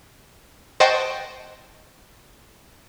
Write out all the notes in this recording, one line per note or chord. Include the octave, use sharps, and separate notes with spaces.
C5 D#5 F#5 G5 A5 C#6